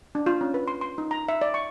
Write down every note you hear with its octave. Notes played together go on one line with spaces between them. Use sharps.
D4
F4
C#4
B4
C6
C6
D#4
A#5
E5
D5
C#6